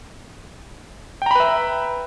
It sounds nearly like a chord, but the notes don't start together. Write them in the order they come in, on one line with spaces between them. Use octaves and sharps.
G5 A#5 B5 B4 E5